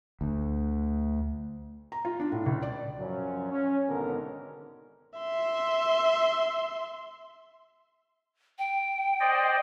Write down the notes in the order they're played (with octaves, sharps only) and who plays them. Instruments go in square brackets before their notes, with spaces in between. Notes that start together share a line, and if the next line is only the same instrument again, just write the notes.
[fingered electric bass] D2
[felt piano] A#5
F4
D4
A2
C#2
D5
[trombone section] F#2 F3 F#3 C#4
C#4
G#1 B2 D3 B3 D#4 A#4
[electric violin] E5 C6
[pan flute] G5
[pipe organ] C5 D5 D#5